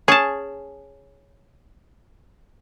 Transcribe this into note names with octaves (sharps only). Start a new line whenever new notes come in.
C#4 G#4 A5